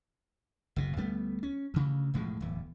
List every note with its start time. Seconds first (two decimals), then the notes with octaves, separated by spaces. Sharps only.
0.76 F#1 B2
0.97 D2 G3 A3 B3
1.43 C#4
1.74 D2 C#3
2.14 E1 A2 F3 G#3
2.40 D1 E2